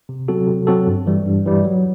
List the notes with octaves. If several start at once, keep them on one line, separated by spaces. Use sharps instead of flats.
C3
F#3 C4 F#4 A4
C3
F#3 C4 F#4 A4
G2
E3 G3
G2
E3 G3
F#3